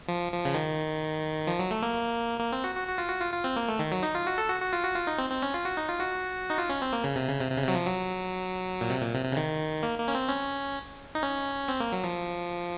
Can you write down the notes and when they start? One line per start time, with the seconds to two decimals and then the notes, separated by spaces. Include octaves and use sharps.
0.08 F3
0.32 F3
0.45 C#3
0.54 D#3
1.47 F3
1.59 F#3
1.71 A3
1.82 A#3
2.40 A#3
2.52 C4
2.64 F#4
2.75 F#4
2.87 F#4
2.98 F4
3.10 F#4
3.21 F4
3.33 F4
3.44 C4
3.56 A#3
3.68 A3
3.79 D#3
3.92 F#3
4.03 D#4
4.15 F4
4.27 F#4
4.38 A4
4.49 F#4
4.62 F#4
4.73 F4
4.84 F#4
4.96 F4
5.07 D#4
5.18 C4
5.30 C4
5.42 C#4
5.54 F4
5.65 F#4
5.77 D#4
5.89 F4
6.00 F#4
6.50 D#4
6.58 F4
6.69 C#4
6.82 C4
6.93 A#3
7.04 C#3
7.16 C3
7.28 C#3
7.40 C3
7.51 C3
7.58 C#3
7.62 C3
7.68 F#3
7.75 F3
7.86 F#3
8.81 A#2
8.90 C3
9.02 A#2
9.13 C3
9.25 C3
9.32 C#3
9.37 D#3
9.83 A#3
9.98 A#3
10.08 C#4
10.15 C4
10.29 C#4
11.15 D#4
11.23 C#4
11.68 C4
11.80 A#3
11.92 F#3
12.04 F3